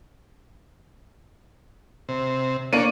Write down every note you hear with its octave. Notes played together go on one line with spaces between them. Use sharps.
C3
A#3 D4 C#5 D5 D#7